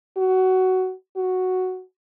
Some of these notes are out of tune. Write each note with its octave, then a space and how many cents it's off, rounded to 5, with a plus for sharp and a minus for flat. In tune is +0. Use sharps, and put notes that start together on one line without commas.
F#4 +15
F#4 +0